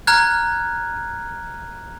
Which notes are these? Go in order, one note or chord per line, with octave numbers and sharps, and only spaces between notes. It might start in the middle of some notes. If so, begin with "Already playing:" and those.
A#5 F6 F#6 G#6